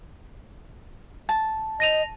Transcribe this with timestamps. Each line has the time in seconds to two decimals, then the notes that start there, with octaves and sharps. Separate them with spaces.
1.29 A5
1.80 D#5 A#6 D#7 F7